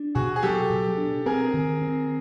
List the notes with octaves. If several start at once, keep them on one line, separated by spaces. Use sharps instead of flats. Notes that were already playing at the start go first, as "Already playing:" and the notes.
Already playing: D4
B2 F#4 G#4
G#4
F#3 G4 A4
B2
D4
C4 G#4 A#4
D#3
C4